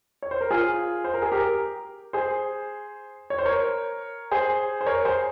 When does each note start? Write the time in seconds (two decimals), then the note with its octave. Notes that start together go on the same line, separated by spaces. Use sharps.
0.22 C#5
0.31 C5
0.41 A#4
0.51 F4 G#4
1.04 C5
1.14 A#4
1.22 G#4
1.32 G4 A#4
2.13 G#4 C5
3.30 C#5
3.38 C5
3.45 A#4 C#5
4.32 G#4 C5
4.81 C5
4.86 A#4 C#5
5.05 G#4 C5